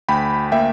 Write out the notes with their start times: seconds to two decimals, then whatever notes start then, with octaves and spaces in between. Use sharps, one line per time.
0.08 D2 G5 B5
0.52 A#3 E5 G5